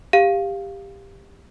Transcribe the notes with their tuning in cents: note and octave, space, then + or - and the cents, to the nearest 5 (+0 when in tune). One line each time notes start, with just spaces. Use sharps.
G4 +15 F5 +0